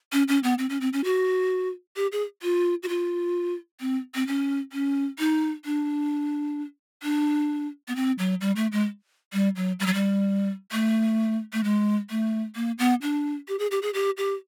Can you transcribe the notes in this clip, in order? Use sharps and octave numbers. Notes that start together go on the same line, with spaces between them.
C#4
C#4
B3
C4
C#4
C4
C#4
F#4
G4
G#4
F4
F#4
F4
C4
C4
C#4
C#4
D#4
D4
D4
B3
C4
F#3
G3
A3
G#3
G3
F#3
G3
F#3
G3
A3
A3
G#3
A3
A#3
B3
D4
G4
G#4
G4
G#4
G4
G4